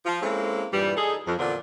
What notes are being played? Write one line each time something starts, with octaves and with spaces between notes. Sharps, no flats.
F3 F4
G#3 A#3 C4 C#4 E4 A4
G2 A#2 E3 G3
D#4 G#4 A4
F2
E2 A#2 D3 C4 D4